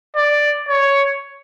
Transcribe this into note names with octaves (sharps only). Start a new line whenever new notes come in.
D5
C#5